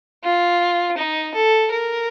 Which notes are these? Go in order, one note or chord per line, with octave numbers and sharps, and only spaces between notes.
F4
D#4
A4
A#4